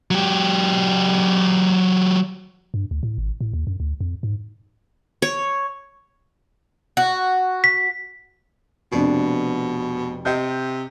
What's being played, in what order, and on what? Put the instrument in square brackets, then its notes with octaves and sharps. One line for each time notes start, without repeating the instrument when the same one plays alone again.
[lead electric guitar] F#3 G4
[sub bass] G2
D2
A2
G#1
A2
D#2
F#2
D2
F2
G#2
[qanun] C#5
[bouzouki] F#4
[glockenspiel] B6
[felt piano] F1 F2 D4 [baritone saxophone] B2
[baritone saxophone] C3 [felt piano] D#5 G6